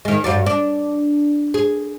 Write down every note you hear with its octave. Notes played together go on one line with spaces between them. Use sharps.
D#3 G#3
G2 F#3 D5
D4
G#4